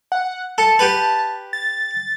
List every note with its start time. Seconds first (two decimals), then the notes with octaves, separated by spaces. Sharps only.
0.12 F#5
0.58 A4 A5
0.79 G4 B4
1.53 A6